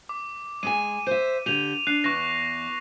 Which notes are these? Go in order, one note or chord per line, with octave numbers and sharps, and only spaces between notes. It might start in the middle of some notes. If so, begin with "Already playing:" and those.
D6
G#3 G#4 G#5 D#7
C5 E5 D#7
D3 G4 D#7 F7
D4 F#6 C7
E2 C#6 F#6 A#6